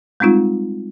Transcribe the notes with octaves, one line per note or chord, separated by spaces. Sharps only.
G3 G#3 C4 D#4 F4